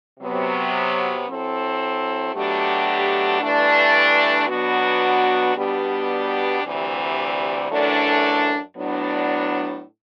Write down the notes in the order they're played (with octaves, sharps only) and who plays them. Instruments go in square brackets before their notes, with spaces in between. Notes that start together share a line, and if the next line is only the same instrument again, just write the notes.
[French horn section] C3 F#3 B3
F#3 C4 E4 A4
B2 F#3 A3 D4 G4
G2 E3 A3 D4
B2 F#3 B3 D4 F#4
B2 G3 B3 D4 G4
D2 C3 E3 G3
F#2 E3 A3 D4 A4
A2 F#3 B3 D4